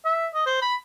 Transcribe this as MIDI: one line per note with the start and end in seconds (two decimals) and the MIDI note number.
0.05 0.27 76
0.34 0.45 75
0.46 0.57 72
0.62 0.75 83